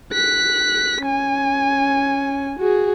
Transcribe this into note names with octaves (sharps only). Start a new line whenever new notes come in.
F#6 B6
C#4 G#5
F#4 G#4